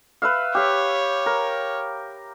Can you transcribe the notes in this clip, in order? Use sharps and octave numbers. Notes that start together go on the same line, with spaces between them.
B4 E5 F5
G4 C#5 F5
A#4